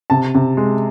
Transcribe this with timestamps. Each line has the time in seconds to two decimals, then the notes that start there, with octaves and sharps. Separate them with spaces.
0.10 C3 A5
0.35 C3
0.57 G#3